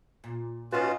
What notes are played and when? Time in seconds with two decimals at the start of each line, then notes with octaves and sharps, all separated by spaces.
0.24 A#2
0.72 A2 C#4 D#4 F4 F#4 B4 D#5 A5